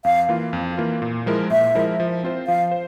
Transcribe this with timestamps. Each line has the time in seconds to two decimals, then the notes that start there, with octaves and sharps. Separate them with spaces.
0.05 F2 F5
0.29 E3 A#3 F4
0.53 F2
0.77 E3 A#3 F4
1.02 A#2
1.26 F3 G#3 E4 A#4
1.50 A#2 E5
1.75 F3 G#3 E4 A#4
2.00 F3
2.23 C4 F4 C5
2.47 F3 F5
2.71 C5